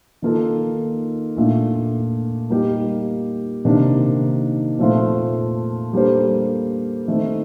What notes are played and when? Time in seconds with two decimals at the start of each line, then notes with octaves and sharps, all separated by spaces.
0.22 D#3 A#3 F4 A4
1.36 A#2 A3 D4
2.50 G3 A#3 D#4 G4
3.65 C3 D#3 A#3 D4
4.78 A#2 F3 A3 C4 F4
5.93 G3 A#3 D4 A4 C5
7.08 D#3 A3 C4